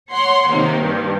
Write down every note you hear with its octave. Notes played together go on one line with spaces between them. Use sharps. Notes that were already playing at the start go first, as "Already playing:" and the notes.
C#5 F#5 C6
C3 D#3 A#3
G2